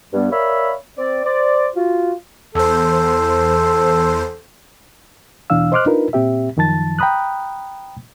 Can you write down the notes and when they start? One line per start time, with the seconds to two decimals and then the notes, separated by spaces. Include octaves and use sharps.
0.13 G2 G3 B3
0.32 A#4 C#5 D5 E5 F5 B5
0.98 C4 D5
1.25 C5 D5
1.75 F4 F#4
2.55 E2 A4 C5
5.50 E2 B2 E3 D4 F5 E6
5.72 C5 D#5 C6 D6 F6 F#6
5.86 D4 D#4 F4 A#4 B4
6.13 A#2 C4 G4 E5
6.57 F#2 D#3 F3 A5 A6
6.99 G5 A#5 B5 D#6 F#6